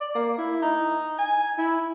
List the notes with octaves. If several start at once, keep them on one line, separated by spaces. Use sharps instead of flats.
D5
A#3
E4
D#4
G#5
E4